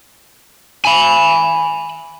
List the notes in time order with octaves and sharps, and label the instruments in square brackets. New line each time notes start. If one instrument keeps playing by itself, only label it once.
[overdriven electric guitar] G#5 B5